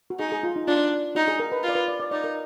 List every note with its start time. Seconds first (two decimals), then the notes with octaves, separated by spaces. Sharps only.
0.10 F#4
0.19 D#4 G#4
0.32 G#4
0.43 F4
0.56 D#4
0.67 D4 F4
1.15 D#4 F#4
1.28 G#4
1.40 A#4
1.52 B4
1.64 F4 D5
1.75 B4
1.88 D5
2.00 D5
2.11 D#4 D5
2.24 A#4